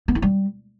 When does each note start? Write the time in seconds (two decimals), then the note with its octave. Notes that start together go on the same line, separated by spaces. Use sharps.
0.08 B3
0.15 E4
0.22 G3